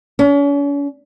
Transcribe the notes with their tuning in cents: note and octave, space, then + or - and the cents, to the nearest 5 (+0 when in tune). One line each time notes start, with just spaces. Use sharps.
C#4 +40